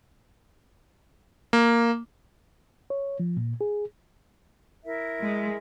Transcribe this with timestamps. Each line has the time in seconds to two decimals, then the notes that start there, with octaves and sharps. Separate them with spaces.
1.53 A#3
2.90 C#5
3.20 F3
3.37 A#2
3.61 G#4
4.84 E4 A#4 E5
5.22 G#3